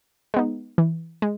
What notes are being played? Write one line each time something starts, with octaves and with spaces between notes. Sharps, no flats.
G#3 B3 D#4
E3
G#3